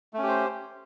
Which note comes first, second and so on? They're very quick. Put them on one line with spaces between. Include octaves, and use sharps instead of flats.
A3 C#4 G4 C5